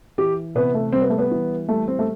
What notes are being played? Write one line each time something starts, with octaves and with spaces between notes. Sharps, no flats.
E3 G4
C3 B3
A3
G3 C4
B3
A3
B3
E3
G3 A3
C4
A3